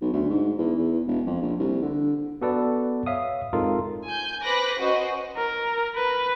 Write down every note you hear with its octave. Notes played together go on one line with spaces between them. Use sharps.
B1
D2
G#2
E2
E2
E1
F2
A#1
C2
D3
B3 F#4 A4 B4 D5
C#5 E5 F5 D#6
G#3 C4 D#4 F4 A4 A#4
G#5 G6
B4 C5 B5 D6 F#6 A#6
C#4 F#4 B4 C5 D#5
A#4
B4